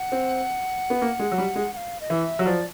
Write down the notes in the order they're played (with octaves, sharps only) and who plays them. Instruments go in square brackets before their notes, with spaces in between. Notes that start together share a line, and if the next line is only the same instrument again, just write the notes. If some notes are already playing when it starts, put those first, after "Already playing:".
Already playing: [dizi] F#5
[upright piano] C4
B3
A#3
G#3
F#3
G3
G#3
[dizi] F#5
F5
D#5
[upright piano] E3 [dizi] E5
[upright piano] F#3
[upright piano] F3 [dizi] D5